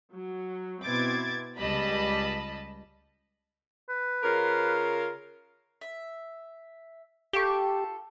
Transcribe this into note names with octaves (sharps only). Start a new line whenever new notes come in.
F#3
B2 C4 E4 D6 G#6 A6
C#2 G3 D#5 A5 B5
B4
C#3 F4 A#4
E5
F4 G4 A4 C#6